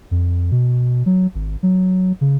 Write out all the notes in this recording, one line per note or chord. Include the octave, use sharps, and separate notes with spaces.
F2
B2
F#3
G#1
F#3
C#3